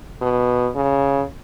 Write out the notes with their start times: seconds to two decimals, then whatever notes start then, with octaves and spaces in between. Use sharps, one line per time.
0.21 B2
0.75 C#3